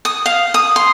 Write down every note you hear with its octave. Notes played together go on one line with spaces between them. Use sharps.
D#6
F5
D#6
C6